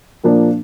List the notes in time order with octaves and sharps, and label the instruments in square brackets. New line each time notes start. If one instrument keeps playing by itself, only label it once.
[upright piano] A#2 F3 A#3 D4